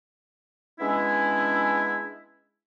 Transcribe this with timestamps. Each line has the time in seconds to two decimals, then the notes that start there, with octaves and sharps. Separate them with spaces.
0.80 G#3 B3 C#4 D4 E4